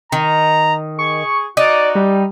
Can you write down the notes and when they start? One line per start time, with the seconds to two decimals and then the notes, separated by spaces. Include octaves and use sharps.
0.12 D#3 A#5
0.99 G#4 C#6
1.57 D#4 F#4 D5
1.95 G3